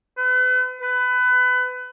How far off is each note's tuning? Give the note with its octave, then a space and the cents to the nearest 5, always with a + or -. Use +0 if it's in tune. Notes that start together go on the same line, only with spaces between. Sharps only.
B4 +40
B4 +25